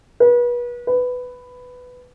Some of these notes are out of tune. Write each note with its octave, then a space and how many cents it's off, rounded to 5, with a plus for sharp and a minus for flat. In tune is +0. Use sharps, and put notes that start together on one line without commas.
B4 -35
B4 +10